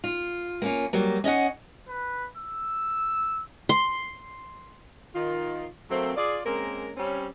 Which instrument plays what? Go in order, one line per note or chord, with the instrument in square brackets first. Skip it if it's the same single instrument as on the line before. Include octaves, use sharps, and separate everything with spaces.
[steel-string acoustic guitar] F4
A#3 C#4 F4
F#3 G3 A#3
C#4 D#5 E5 F#5
[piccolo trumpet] B4
E6
[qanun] C6
[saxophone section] D#3 F4
F#3 A3 A#3 C4
F4 G#4 D5
G#3 A#3 C4 C#4 A#4
G3 C4 C#4